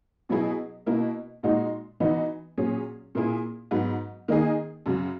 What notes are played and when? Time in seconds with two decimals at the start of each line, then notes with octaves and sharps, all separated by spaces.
0.29 B2 F#3 B3 E4 G#4
0.86 B2 A#3 E4
1.43 A#2 G#3 D#4 F#4
2.00 E3 B3 D#4 F#4
2.58 A#2 F#3 C#4 G#4
3.15 A#2 A#3 E4 G#4
3.71 G#2 F#3 B3
4.28 D#3 A#3 D#4 G#4
4.86 F#2 C#3 F#3